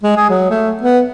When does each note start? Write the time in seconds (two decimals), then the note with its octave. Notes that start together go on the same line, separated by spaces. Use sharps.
0.03 G#3
0.17 G#4
0.29 F#3
0.50 A3
0.81 B3